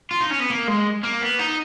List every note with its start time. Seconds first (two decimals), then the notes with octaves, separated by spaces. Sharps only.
0.11 F4
0.21 D#4
0.31 C#4
0.40 B3
0.50 A#3
0.68 G#3
1.03 A#3
1.21 B3
1.39 D#4